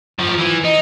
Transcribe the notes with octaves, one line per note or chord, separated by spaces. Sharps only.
F#2 F3
E3
D#4